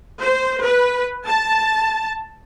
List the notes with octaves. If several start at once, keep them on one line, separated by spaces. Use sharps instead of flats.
C5
B4
A5